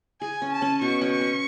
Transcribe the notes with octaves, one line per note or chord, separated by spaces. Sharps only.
G#4 G#5
C#4
A5
C#4
B2 C#6
C#4
C#6
C#4